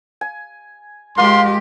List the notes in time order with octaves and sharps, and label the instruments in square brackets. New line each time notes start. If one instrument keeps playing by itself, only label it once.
[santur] G#5
[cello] G#3 G4 [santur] A#3 F4 [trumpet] C6